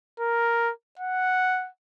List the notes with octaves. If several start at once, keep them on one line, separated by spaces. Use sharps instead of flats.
A#4
F#5